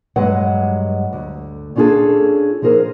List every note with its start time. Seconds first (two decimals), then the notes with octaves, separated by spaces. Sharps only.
0.16 G2 F#3 G#3 B4 F#5
1.13 D2
1.76 C#4 D4 F4 F#4 G#4 A4
2.62 F3 D#4 G#4 A#4 C5